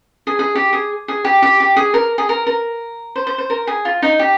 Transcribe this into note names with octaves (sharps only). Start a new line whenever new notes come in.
G#4
G#4
G4
G#4
G#4
G4
G4
G4
G#4
A#4
G#4
A#4
A#4
C5
C5
C5
A#4
G#4
F4
D#4
G4